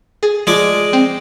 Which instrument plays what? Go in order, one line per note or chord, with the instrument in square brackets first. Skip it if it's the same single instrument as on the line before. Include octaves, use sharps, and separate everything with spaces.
[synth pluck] G#4 A6
[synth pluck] F3 [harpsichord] G#3 D5
[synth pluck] C4